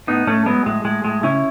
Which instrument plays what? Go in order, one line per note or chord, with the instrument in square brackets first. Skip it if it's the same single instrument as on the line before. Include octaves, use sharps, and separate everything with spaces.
[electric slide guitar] A2 B3 D#4
A2 A3 C#4
F#3 G#3 B3
A2 G#3
A2 G#3
A2 G#3
C#3 C#4 E4